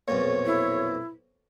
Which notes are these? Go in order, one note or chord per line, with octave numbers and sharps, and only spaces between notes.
B1 F2 A#2 C#5
E4